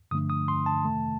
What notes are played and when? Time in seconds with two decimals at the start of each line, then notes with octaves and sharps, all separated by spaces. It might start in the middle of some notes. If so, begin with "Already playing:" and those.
0.11 G2 D3 F3 A3 D4 D#6
0.30 D#6
0.48 C6
0.66 A5
0.85 F2 C3 D#3 A3